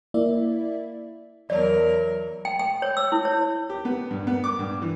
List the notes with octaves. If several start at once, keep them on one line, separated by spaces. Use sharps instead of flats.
A#3 E4 D5 E5
E2 F#3 A#4 C#5 D5
G5
G5
C#5
E6
E4
C#5
G4
B3
G2
B3
D6
G2
E3